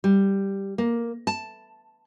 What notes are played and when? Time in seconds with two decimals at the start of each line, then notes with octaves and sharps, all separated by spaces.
0.04 G3
0.78 A#3
1.27 A5